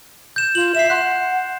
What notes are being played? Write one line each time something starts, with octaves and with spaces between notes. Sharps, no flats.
G6 E7
F4 F#7
E5 C7 E7
F#5 C6 F#6